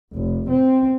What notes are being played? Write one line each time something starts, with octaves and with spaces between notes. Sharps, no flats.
F1
C4